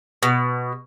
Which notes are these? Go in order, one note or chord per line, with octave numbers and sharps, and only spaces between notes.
B2